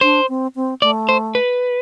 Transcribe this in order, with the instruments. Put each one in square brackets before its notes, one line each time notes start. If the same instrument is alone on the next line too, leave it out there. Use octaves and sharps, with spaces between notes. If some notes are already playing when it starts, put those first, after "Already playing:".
[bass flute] D4 [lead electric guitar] C5
[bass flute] C4
C4
[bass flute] A3 [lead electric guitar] D5
[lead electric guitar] C5
B4